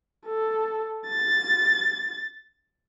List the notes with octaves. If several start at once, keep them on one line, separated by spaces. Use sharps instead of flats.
A4
A6